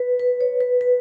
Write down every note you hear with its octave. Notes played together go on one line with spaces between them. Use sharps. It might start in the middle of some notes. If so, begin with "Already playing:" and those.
Already playing: B4
B4
C#5
B4
B4